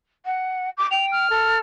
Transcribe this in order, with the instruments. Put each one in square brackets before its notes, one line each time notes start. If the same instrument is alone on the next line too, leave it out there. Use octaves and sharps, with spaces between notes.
[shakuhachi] F#5
D6
[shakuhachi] G5 [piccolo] F7
[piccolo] F6
[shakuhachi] A4